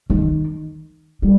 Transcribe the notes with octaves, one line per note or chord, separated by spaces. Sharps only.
D#3
G3